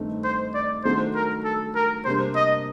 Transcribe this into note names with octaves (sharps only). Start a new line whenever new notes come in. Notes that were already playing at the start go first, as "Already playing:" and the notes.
Already playing: G2 D#3 A3 C4 D#4
C5
D5
D#3 F#3 A3 D4 A4 C5
A#4
A4
A#4
C3 G3 A#3 D4 C5
D#5